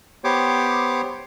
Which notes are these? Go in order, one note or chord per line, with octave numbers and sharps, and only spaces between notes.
B3 G4 C5 C#5 D6